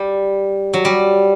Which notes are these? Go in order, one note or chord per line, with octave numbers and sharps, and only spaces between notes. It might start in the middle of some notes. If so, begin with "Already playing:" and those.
Already playing: G3
F#3
G3